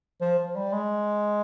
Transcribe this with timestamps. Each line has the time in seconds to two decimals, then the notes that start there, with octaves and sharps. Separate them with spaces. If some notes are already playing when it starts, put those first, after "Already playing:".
0.22 F3
0.39 F3
0.56 G3
0.73 G#3